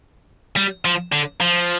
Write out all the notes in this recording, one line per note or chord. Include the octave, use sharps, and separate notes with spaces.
G3
F3
D3
F3